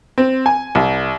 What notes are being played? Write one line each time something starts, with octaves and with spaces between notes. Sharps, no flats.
C4
G#5
C2